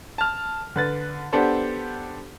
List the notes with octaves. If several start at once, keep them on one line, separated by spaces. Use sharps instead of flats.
A5 F6
D3 B4 A6
B3 D4 G4 A4 C5